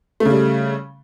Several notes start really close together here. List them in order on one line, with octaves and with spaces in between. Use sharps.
A3 C#3 G3